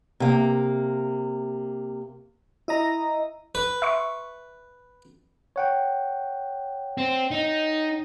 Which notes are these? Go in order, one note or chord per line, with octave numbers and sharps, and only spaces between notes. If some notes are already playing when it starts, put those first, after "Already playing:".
C3 A#3
E4 D#5 A#5
B4
E5 C6 C#6
C#5 F#5 G5
C4
D#4